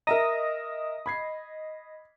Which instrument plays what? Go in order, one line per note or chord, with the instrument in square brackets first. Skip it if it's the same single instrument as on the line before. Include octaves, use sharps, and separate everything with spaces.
[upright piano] A#4 E5 A#5 [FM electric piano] D#5 D#6 A#6
[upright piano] B5 G#6 C7